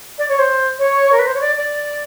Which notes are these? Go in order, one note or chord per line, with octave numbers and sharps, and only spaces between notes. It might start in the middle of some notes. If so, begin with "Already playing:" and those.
D5
C#5
C5
C#5
A#4
B4
C5
C#5
D5
D5